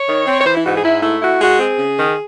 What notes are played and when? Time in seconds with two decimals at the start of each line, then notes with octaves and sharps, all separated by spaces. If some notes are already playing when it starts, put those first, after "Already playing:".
Already playing: C#5
0.08 D#3
0.27 C4
0.39 C#5
0.45 E3 C5
0.55 E4
0.64 G#2 F#4
0.74 G#4
0.83 G#2 E4
1.02 A3 E4
1.21 E4 F#4
1.41 G#3 F#4
1.59 C4 G#4
1.78 C#3
1.98 D#3